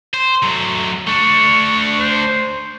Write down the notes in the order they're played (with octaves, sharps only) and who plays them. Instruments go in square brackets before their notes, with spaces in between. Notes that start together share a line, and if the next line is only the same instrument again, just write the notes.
[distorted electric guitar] C5
F#3 A3
[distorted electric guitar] A3 D4 [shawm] C#6
[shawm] C5